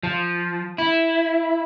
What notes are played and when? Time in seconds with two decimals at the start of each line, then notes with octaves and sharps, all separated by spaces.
0.03 F3
0.78 E4